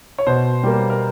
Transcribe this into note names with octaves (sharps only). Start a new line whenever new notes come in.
C#5
B2 C5
G3 A#3
A#4